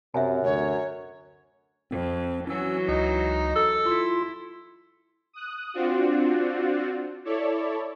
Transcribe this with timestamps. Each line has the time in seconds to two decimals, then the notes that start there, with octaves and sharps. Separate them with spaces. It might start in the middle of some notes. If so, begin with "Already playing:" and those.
0.14 F#2 C3 E5 G#5
0.45 D2 C#5
1.91 F2 C4
2.47 E3 F#3 C#4 F#4 E6
2.88 C#2 D#4
3.56 A4
3.86 E4 F4 C6
5.33 D#6 F#6
5.74 C4 D4 F4 F#4
7.25 E4 A4 C#5 D5